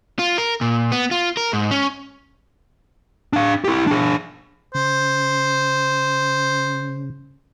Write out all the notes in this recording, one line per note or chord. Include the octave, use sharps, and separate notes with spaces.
F4
A#4
A#2
B3
F4
A#4
G#2
C#4
D4 F5
E4 G4
D4 G#4
C#3 C5